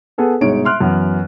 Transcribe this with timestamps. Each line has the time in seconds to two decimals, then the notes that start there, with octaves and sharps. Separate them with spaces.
0.18 B3 G#4 A4 B4
0.41 G1 B2 G#3 D#4 C#5 D7
0.65 E5 C6 F6 F#6
0.80 F#2 E3 B3